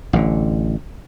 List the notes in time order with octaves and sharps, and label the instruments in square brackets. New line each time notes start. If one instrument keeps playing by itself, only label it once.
[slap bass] A1 D3